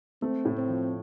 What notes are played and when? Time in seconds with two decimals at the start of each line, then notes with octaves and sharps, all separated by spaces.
0.22 A3 C4
0.45 A2
0.57 C4
0.69 F3